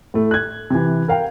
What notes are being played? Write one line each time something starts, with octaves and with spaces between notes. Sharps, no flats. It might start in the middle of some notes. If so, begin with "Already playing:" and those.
A2 A3
F#6 G#6
C3 E3
A#4 F5 G5